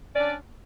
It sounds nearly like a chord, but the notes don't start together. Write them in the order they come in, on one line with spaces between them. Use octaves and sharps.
C#4 D5 D4